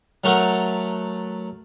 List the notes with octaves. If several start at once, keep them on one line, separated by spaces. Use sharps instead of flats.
F#3 A3 A#4 F#5